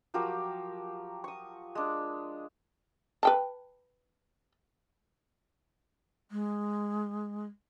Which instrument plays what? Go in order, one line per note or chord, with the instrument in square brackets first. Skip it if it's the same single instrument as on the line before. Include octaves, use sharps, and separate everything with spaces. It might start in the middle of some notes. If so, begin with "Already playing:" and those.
[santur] F3 F#3 G4 A#4
C#6 D#6
G#3 D4
[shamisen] B4 G5 A5
[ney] G#3